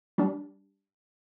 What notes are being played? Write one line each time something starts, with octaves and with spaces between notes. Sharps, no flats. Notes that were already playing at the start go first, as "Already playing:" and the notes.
G3 D4